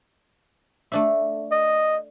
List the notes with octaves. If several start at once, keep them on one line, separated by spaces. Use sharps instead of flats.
A3 D4 E5
D#5